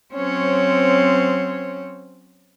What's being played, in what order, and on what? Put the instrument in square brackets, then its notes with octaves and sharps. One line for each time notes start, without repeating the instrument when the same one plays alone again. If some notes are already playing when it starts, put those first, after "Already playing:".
[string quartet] F#3 C4 C#4 C5 C#5